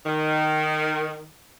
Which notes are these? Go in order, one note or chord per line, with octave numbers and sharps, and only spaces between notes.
D#3